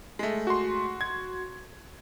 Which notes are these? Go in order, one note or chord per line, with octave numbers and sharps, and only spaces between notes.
G#3 A3
F#4 C6
G#6